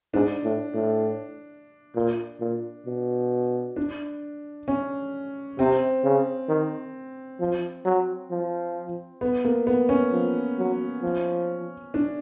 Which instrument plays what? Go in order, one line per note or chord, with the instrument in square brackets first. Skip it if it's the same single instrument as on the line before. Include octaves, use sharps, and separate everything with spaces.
[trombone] G#2 [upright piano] D4
[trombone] A2
A2
A#2
A#2
B2
[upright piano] D4
C#4
[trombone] C3 [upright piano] C4
[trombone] C#3
D#3
F3
F#3
F3
[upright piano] B3
A#3
B3
C#4
[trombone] F3
F#3
F3
[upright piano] D4